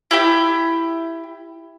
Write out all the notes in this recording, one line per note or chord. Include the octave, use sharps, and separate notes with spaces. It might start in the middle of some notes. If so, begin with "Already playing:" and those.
E4 G4 G5